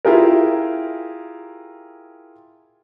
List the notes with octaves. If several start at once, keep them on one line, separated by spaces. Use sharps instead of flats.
E4 F4 G4 G#4 A#4